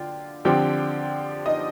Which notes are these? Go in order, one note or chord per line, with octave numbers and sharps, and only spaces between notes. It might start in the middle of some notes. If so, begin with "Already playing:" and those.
Already playing: D3 F4 G5
D3 F3 C4 G4 G5
D#4 D#5